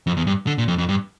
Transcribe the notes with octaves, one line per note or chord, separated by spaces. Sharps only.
F2
E2
G2
D3
A#2
F2
F2
G2